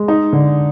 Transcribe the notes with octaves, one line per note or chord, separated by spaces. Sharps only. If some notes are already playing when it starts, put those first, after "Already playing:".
Already playing: G#3
D#4
D3